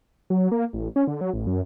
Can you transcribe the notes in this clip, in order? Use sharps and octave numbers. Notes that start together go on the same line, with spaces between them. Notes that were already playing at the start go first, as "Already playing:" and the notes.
F#3
A#3
A1
C#4
D3
F#3
A1
F#2